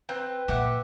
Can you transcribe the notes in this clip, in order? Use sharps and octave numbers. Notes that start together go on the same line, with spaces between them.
C4 B4 G5
A#2 G4 E5 F#5